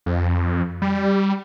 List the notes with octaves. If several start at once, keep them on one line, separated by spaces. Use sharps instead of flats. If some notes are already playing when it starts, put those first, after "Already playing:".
F2
G3